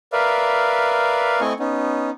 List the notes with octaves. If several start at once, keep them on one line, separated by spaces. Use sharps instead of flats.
A#4 B4 D5 E5 F5
A3 C4 E4 D#5 G#5 C#6
B3 C#4 D#4